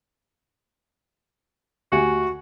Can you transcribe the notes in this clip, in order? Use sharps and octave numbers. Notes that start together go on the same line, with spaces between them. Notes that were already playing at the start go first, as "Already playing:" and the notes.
D2 F#4 G4 G#5